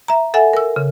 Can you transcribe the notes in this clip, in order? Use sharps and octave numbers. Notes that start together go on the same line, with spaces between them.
E5 A#5
A4 E5 F#5 G#5
A#4 E6
C#3